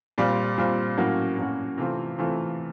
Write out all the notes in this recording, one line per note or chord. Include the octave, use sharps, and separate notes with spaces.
A#2 G3 C4 F4
A#2 G3 C4 F4
A2 F#3 A#3 C#4 F#4
A2 F#3 A#3 C#4 F#4
C3 E3 A3 C4 F4
C3 E3 A3 C4 F4